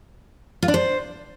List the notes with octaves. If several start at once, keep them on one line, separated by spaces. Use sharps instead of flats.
F4
D4
C5